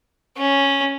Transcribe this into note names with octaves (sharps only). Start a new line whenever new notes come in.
C#4